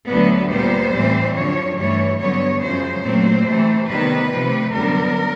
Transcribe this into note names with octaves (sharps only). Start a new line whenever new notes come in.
D2 D3 F#3 B3 B4
A#2 G3 B3 C5
A2 E3 G3 C4
F#2 D3 F3 C#5
G2 E3 A3 C#5
G2 D3 F#3 B3 C#5
F#2 C#3 F3 G#3 C5
A#2 F#3 A3 C4
C3 E3 A3
C3 D#3 G3 B3 B4
C3 F3 A3
F#2 D3 G3 B3 A#4